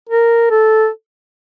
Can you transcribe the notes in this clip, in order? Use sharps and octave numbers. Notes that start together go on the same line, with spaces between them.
A#4
A4